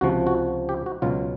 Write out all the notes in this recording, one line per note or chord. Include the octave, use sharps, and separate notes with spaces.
C#2 C3 F3 F#4
F#4
G4
F#4
C#2 B2 F#3 F4